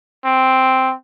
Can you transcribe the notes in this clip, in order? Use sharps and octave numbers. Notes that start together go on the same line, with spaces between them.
C4